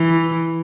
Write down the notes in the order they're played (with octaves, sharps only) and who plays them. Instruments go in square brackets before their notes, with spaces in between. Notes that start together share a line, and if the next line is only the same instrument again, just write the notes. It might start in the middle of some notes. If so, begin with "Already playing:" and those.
Already playing: [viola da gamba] E3